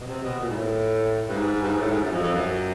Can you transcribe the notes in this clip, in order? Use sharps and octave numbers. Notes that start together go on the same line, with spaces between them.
B2
C3
B2
A#2
G#2
A2
G2
G#2
G2
G#2
A2
G#2
F#2
F2
F2
F#2